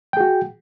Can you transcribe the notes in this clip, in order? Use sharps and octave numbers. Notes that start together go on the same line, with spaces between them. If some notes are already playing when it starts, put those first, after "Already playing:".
F#4 G#4 G5